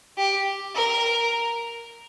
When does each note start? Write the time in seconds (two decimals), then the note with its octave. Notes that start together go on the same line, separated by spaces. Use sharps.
0.18 G4
0.75 A#4